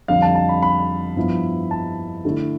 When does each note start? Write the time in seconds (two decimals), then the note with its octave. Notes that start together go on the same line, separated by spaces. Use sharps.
0.08 F2 D3 G3 D4 F5
0.22 A5
0.35 A5
0.49 B5
0.63 B5
1.16 G2 F3 B3 E4
1.71 A5
2.25 D3 A3 E4